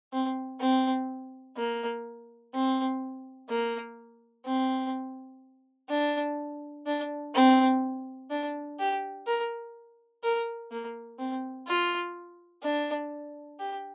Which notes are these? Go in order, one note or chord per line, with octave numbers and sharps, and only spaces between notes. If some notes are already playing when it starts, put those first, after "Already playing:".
C4
C4
A#3
C4
A#3
C4
D4
D4
C4
D4
G4
A#4
A#4
A#3
C4
F4
D4
G4